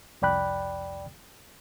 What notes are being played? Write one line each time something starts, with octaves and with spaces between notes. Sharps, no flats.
C2 F2 D5 G5 B5 F#6